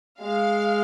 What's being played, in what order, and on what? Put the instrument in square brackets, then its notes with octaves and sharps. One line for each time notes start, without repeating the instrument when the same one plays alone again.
[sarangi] G#3 [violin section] F5